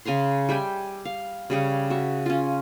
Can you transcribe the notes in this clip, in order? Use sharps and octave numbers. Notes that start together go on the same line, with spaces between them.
C#3 G#5 A#5 C6
G3 E5 G5 G#5
F5
C#3 G3 G#4 C#5
F#4 E5
C#4 F4